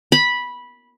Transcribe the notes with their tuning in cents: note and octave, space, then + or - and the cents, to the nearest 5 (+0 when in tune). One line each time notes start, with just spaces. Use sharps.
B5 -10